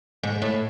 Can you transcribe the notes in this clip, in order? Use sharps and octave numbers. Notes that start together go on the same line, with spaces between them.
G#2
A2